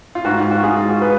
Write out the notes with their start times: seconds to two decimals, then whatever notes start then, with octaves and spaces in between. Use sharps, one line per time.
0.15 F4
0.25 G#2 F#4
0.38 F4
0.51 F#4
0.63 G#2 F4 G#4
0.76 F4
0.89 F#4
1.02 G#4 B4